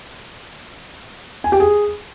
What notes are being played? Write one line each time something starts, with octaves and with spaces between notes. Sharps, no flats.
G#5
G4
G#4